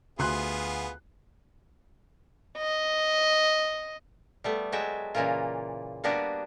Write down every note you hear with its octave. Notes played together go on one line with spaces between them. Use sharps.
D2 B3 F4 G#4 C6 F#6
D#5
G3 A3 B3
F#3 G#3 F#4 E5 G5 A5
A#2 C#3 E3 A#3 F4
G3 A#3 B3 D4 F#4 G4